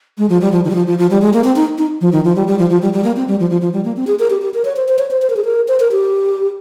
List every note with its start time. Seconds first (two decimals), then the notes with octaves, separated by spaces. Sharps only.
0.18 G#3
0.30 F3
0.41 G3
0.52 F3
0.64 D#3
0.70 G3
0.75 F3
0.87 F3
0.98 F3
1.10 G3
1.22 G#3
1.33 A#3
1.44 C4
1.56 D#4
1.78 D#4
2.01 F3
2.12 D#3
2.25 F3
2.36 G3
2.48 G3
2.59 F3
2.70 F3
2.82 G3
2.93 G3
3.04 A#3
3.16 C4
3.28 G3
3.39 F3
3.50 F3
3.61 F3
3.73 G3
3.85 A#3
3.96 C4
4.07 G#4
4.19 A#4
4.30 G4
4.42 G4
4.54 A#4
4.65 C#5
4.76 C5
4.88 C5
4.99 C#5
5.11 C5
5.22 C5
5.30 A#4
5.36 G#4
5.45 A#4
5.68 C5
5.80 A#4
5.91 G4